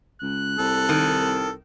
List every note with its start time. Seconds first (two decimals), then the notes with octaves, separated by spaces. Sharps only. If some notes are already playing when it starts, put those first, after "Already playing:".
0.22 C#2 F#6
0.59 C2 A4
0.89 D#3